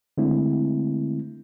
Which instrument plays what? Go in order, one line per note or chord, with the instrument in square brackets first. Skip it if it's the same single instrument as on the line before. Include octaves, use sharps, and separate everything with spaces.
[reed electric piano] D3 G#3 A3 C4 E4